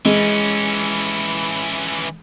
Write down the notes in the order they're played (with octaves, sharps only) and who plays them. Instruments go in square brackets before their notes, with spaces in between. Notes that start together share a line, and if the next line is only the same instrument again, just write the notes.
[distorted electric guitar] E3 C#4 [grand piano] G#3